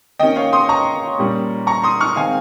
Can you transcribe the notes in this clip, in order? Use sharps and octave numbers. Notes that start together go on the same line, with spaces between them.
D#3 A#3 C#4 D#5 G5
C#5 F5
C6 D#6
A#5 C#6
A#2 G3 A#3 C#4
A#5 C#6
C6 D#6
C#6 F6
D#3 G#3 C4 F5 G#5